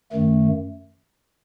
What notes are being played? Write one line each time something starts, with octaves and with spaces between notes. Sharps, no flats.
F#2 D#3 A3